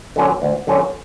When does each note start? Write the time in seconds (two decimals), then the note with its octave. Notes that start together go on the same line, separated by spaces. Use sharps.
0.16 D3 F#3 C#4 F#4
0.42 D2
0.67 D3 F#3 C#4 F#4